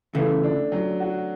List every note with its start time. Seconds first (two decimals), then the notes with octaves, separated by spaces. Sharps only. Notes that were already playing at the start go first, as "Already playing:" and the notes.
0.15 C#3 E3 A3
0.43 D4
0.72 F#3
1.00 F#4